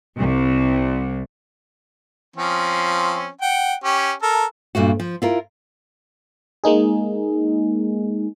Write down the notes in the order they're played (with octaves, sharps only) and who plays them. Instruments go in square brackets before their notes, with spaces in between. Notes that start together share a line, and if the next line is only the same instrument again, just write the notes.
[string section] C2
[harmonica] F3 C4 C#4
F#5 G5
C#4 G4
A4 A#4
[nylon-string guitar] G2 A#2 A3 F#4
F3
E4 F4 A#4
[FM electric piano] G#3 A#3 D#4 G#4